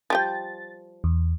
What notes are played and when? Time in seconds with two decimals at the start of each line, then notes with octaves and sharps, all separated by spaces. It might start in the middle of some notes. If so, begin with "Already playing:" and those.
0.10 F3 G3 G5 A6
1.04 E2